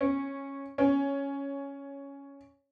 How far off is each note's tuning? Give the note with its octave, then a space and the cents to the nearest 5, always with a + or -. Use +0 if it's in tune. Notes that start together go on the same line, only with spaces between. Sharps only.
C#4 -15
C#4 +0